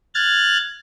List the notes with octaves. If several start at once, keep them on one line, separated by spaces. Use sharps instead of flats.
F6 F#6 G#6 A6